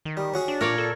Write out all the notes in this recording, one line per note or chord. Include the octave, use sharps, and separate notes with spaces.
D#3
G3
C#4 F#4 G#4
D4
A#2 A#4 C#5 D5
A4